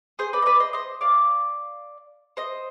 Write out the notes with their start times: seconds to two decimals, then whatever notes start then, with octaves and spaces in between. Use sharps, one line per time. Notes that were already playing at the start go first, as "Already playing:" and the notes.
0.19 G#4 C5
0.33 B4 D5
0.42 D#5
0.46 B4 D5
0.60 C5 D#5
0.73 C5 D#5
1.01 D5 F5
2.37 C5 D#5